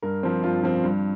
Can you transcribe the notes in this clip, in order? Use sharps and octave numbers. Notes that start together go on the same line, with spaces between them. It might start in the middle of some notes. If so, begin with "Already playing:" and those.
G2 A#4
F3 C4
G2 F4
F3 C4
G2